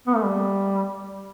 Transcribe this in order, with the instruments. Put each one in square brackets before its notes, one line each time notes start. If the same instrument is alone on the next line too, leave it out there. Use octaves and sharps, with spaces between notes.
[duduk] B3
A3
G3